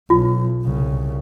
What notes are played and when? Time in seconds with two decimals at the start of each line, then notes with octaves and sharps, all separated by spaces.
0.10 B1 F4
0.63 C2 C#3